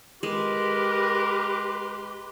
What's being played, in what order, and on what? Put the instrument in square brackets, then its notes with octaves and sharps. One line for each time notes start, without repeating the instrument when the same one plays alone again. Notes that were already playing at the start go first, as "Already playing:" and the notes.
[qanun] G#3 [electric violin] G4 B4 [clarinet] A#4 [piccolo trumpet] C6